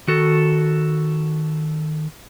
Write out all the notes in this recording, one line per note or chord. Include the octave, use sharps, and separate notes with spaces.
D#3 F#4 A4